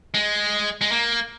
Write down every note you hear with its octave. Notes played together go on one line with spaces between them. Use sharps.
G#3
G#3
A#3